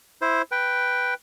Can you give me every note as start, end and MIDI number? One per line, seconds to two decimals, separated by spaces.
0.22 0.42 64
0.22 0.42 72
0.52 1.14 71
0.52 1.14 79